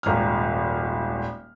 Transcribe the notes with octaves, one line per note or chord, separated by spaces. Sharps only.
D#1 G#1 A#5 F6